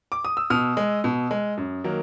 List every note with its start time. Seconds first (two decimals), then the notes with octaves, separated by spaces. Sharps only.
0.12 D6
0.25 D#6
0.37 E6
0.50 B2 D#6 F6
0.77 G#3
1.04 B2
1.31 G#3
1.57 F#2
1.84 D#3 F#3 A#3